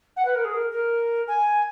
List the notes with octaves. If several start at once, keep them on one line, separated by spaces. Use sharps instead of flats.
F#5
B4
A#4
G#4
A#4
A#4
G#5